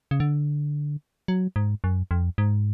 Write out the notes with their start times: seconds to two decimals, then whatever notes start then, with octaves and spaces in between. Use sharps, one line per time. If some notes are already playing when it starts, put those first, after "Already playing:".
0.11 C#3
0.20 D3
1.28 F#3
1.56 G#2
1.84 F#2
2.11 F2
2.38 G#2